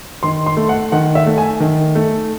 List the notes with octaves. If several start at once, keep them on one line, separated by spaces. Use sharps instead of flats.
D#3 C6
C6
A3
F#5
D#3 F#5
E5
A3
G#5
D#3
A3